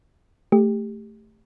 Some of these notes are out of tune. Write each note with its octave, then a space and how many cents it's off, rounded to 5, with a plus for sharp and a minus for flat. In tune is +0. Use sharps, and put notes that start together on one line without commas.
A3 +0 G4 +20